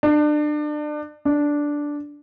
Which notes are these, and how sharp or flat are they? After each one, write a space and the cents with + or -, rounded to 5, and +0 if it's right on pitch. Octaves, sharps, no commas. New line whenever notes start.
D4 +30
D4 -5